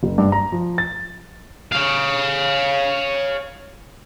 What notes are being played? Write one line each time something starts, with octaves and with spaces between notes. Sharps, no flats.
F#1
G2
A#5
F3
A6
C#5 F5